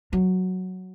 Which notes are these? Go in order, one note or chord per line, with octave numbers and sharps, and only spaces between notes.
F#3